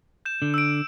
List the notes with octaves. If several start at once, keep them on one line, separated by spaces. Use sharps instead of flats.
G6 E7
D3
E6 D7